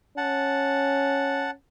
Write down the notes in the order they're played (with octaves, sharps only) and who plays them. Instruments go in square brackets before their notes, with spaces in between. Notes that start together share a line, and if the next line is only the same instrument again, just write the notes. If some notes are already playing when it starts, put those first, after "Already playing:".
[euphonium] C#4 [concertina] F#5 A5